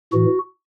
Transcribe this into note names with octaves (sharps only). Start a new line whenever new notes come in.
A2 E3 F#4